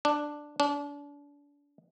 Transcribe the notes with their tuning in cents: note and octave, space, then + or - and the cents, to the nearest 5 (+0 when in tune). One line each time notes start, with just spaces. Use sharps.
D4 +5
D4 -35